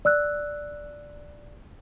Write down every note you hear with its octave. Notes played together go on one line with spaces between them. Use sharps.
D5 E6 F#6